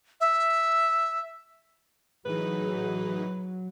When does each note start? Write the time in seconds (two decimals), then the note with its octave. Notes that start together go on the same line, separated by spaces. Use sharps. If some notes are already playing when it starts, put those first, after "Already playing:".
0.21 E5
2.26 A2 E3 F#3 D#4 G#4 B4